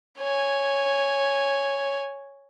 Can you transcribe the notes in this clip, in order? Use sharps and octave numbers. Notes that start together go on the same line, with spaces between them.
C#5 G#5